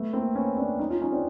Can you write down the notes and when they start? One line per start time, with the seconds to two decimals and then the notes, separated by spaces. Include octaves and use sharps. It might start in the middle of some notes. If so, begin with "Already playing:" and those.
Already playing: A3 B3
0.13 A#3 C4
0.35 B3 C#4
0.57 C4 D4
0.79 C#4 D#4
0.90 D#4 F4
1.01 C#4 D#4
1.12 C4 D4